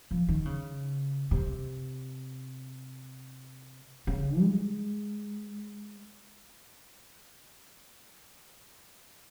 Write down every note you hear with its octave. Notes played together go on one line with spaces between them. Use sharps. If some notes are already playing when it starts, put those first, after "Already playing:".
F3
D#3
C#3
C3
C#3
G#3